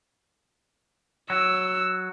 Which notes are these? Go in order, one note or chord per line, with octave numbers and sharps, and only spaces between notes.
F#3 E6